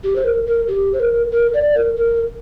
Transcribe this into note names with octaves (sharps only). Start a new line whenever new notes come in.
G4
C5
A#4
A#4
G4
C5
A#4
A#4
D5
A#4
A#4